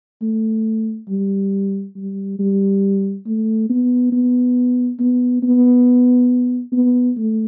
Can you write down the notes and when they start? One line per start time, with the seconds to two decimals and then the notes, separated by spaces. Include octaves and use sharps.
0.22 A3
1.09 G3
1.96 G3
2.39 G3
3.26 A3
3.69 B3
4.12 B3
5.00 B3
5.43 B3
6.73 B3
7.17 A3